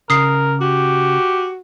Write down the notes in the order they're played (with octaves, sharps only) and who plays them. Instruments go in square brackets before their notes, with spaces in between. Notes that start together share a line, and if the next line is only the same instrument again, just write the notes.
[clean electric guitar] C#3 [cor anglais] A#4 [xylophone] D#6 C7
[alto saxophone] F#4 [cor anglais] G4